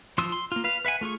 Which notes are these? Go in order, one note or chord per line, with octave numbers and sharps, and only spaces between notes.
F3 F4 C6 D#6 E6
C6
A#3 F4
B4 F5
B4 E5 F#5 G#5
A3 F4 G#4 C#6